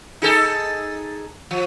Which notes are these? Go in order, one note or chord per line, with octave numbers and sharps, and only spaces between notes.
D#4 G#4 A4
F3